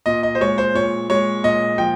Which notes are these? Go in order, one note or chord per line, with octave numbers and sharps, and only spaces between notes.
A#2 D#5
D#5
C5
G#3 C#5
C5
A#2 C#5
G#3 C#5
A#2 D#5
F3 G5